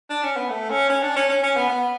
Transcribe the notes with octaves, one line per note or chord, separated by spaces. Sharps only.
D4
C#4
B3
A3
C#4
C#4
D4
C#4
C#4
C#4
B3
B3